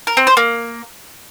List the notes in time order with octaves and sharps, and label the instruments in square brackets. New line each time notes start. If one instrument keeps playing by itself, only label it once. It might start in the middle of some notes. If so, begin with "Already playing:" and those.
[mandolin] A#4
C4
C5
A#3